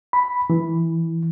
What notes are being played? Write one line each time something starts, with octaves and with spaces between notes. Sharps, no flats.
B5
E3